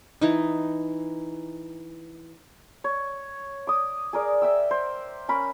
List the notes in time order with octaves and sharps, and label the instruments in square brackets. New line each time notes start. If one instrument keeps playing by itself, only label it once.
[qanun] E3 D#4
[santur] C#5
D6 D#6
G#4 A#4 D5
E5 G5 E6
C5
C#4 A#4 B5